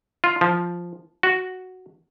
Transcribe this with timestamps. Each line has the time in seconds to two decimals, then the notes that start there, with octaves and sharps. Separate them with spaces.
0.24 F4
0.41 F3
1.23 F#4